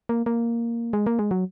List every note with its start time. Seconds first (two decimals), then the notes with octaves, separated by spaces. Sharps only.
0.09 A#3
0.26 A#3
0.93 G#3
1.07 A#3
1.19 G#3
1.31 F#3